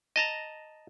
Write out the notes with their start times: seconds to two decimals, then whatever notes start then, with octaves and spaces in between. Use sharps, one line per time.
0.16 D#5 A5 A#5